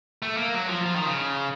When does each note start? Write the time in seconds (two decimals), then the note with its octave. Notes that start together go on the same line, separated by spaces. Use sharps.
0.22 A3
0.37 A#3
0.54 F#3
0.69 F3
0.86 F3
0.95 D#3
1.06 C#3